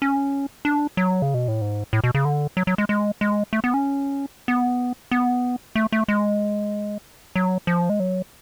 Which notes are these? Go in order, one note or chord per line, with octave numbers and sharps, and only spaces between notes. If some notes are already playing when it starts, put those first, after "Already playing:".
C#4
D4
F#3
C#3
B2
A2
G#2
A2
B2
C#3
D3
F#3
F#3
G#3
G#3
G#3
A3
B3
C#4
B3
B3
A3
A3
G#3
F#3
F3
G#3
F#3